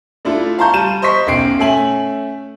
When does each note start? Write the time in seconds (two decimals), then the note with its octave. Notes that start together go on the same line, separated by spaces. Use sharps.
0.25 A3 D4 E4 F4 A4
0.59 F5 A5 A#5 C6 C#6 G6
0.73 G3 A5 D#7 E7
1.02 C5 D#5 C6 C#6 B6
1.27 B1 F#2 G5 C7 D7
1.59 A3 C#4 E5 G#5 F#7